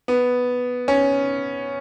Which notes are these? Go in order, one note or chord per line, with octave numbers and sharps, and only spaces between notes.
B3
C#4